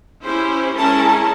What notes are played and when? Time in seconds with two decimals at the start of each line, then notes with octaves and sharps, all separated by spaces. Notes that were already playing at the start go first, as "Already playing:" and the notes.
0.24 C#4 E4 G4 C5
0.75 G#3 C#4 E4 G#4 A#4 A5